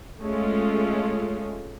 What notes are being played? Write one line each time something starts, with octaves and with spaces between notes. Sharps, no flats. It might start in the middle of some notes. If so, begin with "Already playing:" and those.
G#3 A3 C#4 F4